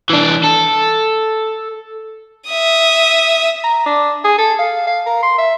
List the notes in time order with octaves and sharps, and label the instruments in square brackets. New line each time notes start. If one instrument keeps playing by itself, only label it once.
[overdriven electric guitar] E3 D4
A4
[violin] E5 D#6
[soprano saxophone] A#5
D4
G#4
A4
F5
F5
A#4
C6
E5